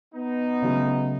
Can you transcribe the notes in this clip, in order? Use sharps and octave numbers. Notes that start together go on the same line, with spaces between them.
B3 D#4
C#3 F#3 A3